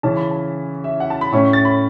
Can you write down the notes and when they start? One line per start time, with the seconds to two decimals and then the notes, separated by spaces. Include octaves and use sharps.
0.03 C#3 E3 C#4 A5
0.17 B5
0.31 A5
0.84 E5
1.00 F#5
1.10 A5
1.21 B5
1.32 A2 A3 C#4 C#6
1.53 A6
1.65 B5